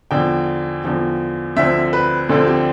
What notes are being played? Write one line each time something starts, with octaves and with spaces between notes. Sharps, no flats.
E2 D3 F3 G5
E2 D3 F3
D2 D3 F3 C4 E5
B4
D2 D3 F3 C4 A4
G4